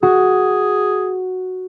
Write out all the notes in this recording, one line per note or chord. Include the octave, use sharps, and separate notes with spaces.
F#4 G#4